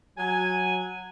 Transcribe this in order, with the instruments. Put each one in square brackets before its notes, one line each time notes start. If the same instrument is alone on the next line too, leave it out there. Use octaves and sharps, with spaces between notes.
[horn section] F#3 G#5